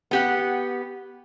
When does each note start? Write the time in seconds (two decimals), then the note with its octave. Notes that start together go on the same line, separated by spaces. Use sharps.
0.11 B3 G4 F#5